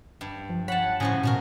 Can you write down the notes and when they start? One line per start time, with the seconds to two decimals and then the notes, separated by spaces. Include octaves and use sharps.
0.21 G2
0.49 F3
0.68 C#5 F#5 A5 B5
1.00 A2 C#3 F3 F#4 G#5
1.23 B2 C#4 F#4 A#4